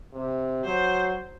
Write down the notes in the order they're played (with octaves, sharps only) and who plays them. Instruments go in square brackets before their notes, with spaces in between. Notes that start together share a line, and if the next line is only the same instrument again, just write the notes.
[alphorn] C3
[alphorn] F#3 [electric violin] C5